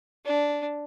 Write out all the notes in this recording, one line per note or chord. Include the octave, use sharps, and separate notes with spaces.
D4